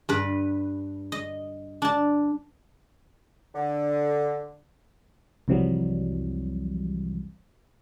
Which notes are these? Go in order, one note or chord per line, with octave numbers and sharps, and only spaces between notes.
G2 B4
D#5
D4 A5
D3
C2 F2 C3 E3 F#3 G3